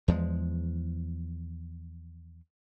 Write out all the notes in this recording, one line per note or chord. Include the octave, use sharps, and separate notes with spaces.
E2 F3 G#3